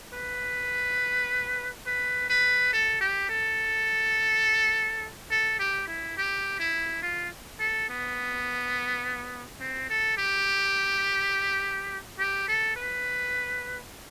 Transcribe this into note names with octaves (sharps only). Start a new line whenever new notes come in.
B4
B4
B4
A4
G4
A4
A4
G4
E4
G4
E4
F4
A4
B3
C4
A4
G4
G4
A4
B4